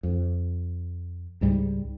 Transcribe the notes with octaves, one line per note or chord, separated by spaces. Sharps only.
F2
C#2 G#2 G3